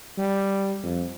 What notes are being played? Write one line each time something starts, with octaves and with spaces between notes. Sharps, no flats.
G3
F2